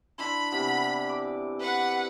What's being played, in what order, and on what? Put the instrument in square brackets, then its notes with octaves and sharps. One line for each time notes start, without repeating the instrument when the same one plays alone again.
[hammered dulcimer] D4 E4 C6 [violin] B5
[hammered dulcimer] C3 E3 B3
D6
[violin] B4 F#5